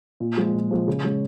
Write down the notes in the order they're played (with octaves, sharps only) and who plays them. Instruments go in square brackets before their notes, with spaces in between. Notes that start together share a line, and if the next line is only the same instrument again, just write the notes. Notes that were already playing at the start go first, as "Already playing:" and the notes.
[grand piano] A#2
F3 G#3
A#2
F3 G#3
C#3
G#3 C#4